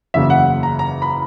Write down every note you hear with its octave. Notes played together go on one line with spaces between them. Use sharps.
F#1 E2 C#3 F#3 A#3 E5
F#5
A#5
A#5
B5